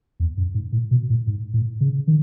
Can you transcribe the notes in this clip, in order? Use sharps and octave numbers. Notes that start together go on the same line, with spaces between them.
E2
F#2
G#2
A2
B2
A2
G#2
A2
C#3
D#3